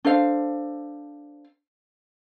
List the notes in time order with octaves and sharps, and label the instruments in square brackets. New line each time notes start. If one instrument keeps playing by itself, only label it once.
[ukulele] D4 A4 C5 F5